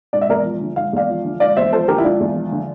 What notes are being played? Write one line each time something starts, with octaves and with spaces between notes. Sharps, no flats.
E1 D5
E5
E2 A#4 D5
F3
D3
E1 F5
E2 D5 F5
F3
D3
E1 D5 F5
E2 C5 E5
F3 A4 C5
D3 G4 A#4
E4
E1 D4 F4
E2
F3
D3